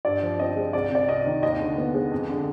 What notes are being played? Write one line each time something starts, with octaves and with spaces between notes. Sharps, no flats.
G2 D5
F3
C4 D#5
G#3
C2 D5
C3 D5
C2 D#5
D#3
D#2 D#5
D3
B3
G#3
F2
D3